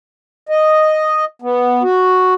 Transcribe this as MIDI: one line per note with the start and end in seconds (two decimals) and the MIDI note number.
0.49 1.25 75
1.42 1.83 59
1.83 2.34 66